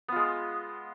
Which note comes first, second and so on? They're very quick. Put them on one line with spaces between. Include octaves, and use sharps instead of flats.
B3 F4 G#3